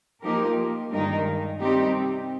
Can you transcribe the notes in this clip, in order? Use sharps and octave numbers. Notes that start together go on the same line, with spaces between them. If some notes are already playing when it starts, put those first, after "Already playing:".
F3 A#3 D#4 G4 A#4
G2 D#3 G#3 D#4 A#4
C3 G3 C4 D#4 G4